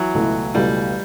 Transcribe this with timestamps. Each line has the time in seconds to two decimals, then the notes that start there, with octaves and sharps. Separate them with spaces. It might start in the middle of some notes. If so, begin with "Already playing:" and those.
Already playing: E3 F#3
0.14 C#2 B2 A3 E4
0.54 C#2 B2 G3 A3 E4